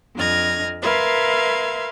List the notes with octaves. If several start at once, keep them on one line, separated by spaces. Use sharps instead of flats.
F2 D4 D#5 F6 G#6 A#6
A#4 B4 E5 F5 C6 G#6